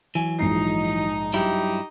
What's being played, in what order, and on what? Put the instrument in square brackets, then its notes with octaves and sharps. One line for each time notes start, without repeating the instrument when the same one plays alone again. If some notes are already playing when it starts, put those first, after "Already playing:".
[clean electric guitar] E3 F#3 [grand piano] G#5
[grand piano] A#1 G#2 C7 [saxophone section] D#4
[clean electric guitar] G2 F#3 E4 [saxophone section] D#4 G4